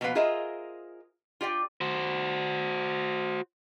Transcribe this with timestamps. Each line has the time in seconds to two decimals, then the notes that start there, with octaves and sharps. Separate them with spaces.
0.01 B2 F3 A#3 B3 B4 F5
0.15 F4 G#4 A#4 C5 D#5 E5
1.41 F4 G4 D5 G5
1.81 F#4 C5